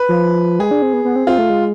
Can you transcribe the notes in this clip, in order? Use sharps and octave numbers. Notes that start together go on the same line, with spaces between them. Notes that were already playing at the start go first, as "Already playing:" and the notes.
Already playing: B4
F3
G#3 G#4
D4
C4
B3
B3
C4
C4 F4
A3
G#3